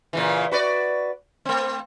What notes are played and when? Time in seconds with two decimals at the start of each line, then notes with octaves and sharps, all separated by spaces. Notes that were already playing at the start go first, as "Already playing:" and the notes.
0.13 A#2 C#3 E3
0.51 F#4 B4 D5
1.45 A3 C4